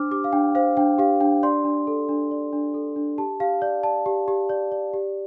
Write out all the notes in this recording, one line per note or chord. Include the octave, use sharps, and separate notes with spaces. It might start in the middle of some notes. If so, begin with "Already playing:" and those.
Already playing: D4 C5 D6 F6
G4 D6
F5
D4 G5
C5 F5
D4 G5
G4 F5
D4 G5
D5 C6
D4
A4
D4
D5
D4
A4
D4
G4 A5
G4 F5
D5
D5 A5
G4
G4
D5
D5
G4